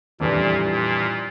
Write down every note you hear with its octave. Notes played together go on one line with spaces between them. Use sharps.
F2 A#2 E3 G3 D4
A#2